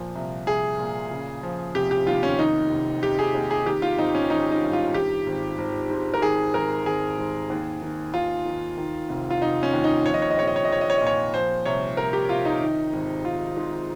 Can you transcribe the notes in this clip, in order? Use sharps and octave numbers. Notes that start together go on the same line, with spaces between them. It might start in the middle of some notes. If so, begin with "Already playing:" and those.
Already playing: A#2 F3
C2
C2 G#4
A#2
C#3
F3
F1 G4
G4
D#2 F4
C#4
D#3 D#4
F1
F1 G4
G#4
D#2
G#4
D#3 G4
F4
G#1 D#4
C#4
G#1 D#4
D#4
G2
F4
D#3 G4
G#1
G#1
G#2
A#4
D#3 G#4
G#1 A#4
G#1 G#4
G#2
D#2
D#3
D#2 F4
D#3
D#3
F1
F4
F1 D#4
C#4
D#2
D#4
F3 C#5
D#5
C#5
D#5
A#1 C#5
D#5
C#5
D#5
A#1 C#5
D#5
C#5
A#2 D#5
C#5
F3 C5
C2 C#5
C2 A#4
G4
C3 F4
D#4
D#3
G#1
G#1 F4
G#2